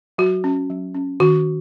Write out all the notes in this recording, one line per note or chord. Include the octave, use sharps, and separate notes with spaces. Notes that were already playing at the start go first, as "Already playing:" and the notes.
F#3 F#4
C#4
F#3
C#4
D#3 F#4